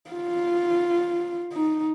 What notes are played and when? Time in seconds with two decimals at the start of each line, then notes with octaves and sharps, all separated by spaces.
0.11 F4
1.53 D#4